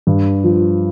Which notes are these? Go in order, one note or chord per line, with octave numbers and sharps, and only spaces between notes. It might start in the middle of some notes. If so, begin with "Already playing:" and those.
G2
F3